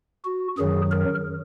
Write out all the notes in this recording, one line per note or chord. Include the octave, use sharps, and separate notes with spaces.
F#4
F#2 D#3 F#3 G#4
A#4